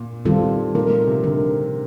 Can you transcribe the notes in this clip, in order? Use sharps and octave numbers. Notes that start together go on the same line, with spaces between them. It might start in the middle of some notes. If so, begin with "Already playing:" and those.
Already playing: A#2
D#3 G3 C4 F4 A4
A#2 F3 A3 D#4 A#4
C3
D3 F3 A3 D#4 A#4